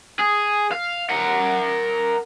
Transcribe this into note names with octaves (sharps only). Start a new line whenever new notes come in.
G#4
F5
A#4 F#5